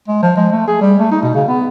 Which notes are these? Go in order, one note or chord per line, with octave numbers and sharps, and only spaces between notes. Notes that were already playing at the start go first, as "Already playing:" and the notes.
G#3
F3
G#3
A3
G#4
G3
A3
D#4
B2
C#3
B3